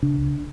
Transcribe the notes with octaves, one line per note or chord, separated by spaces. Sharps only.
C#3 D4
C#2